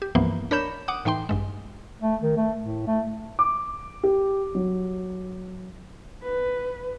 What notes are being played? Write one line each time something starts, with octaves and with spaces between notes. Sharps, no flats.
G4
C2 G2 E3 F3 A#3 B3
D4 A#4 C#5 B5 G6 E7
F#5 D6 D#6
A2 E3 D#4 G5 C6
A1 G2 G#3
A3
D#3
A3
A2
A3
D6
G4
F#3
B4